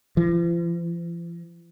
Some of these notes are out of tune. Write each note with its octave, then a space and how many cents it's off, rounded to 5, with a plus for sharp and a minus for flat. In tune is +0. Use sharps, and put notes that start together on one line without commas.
F3 -45